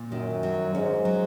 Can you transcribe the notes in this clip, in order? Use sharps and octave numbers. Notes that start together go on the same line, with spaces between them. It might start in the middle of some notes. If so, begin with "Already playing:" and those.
Already playing: A#2
F#2 D#3
F#3
G#2 C#4
F#3